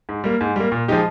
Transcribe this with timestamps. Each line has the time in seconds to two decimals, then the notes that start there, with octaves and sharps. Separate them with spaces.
0.09 G#2
0.24 G3 A#3
0.41 G#2
0.56 G3 A#3
0.72 A#2
0.88 F3 G#3 D#4 G4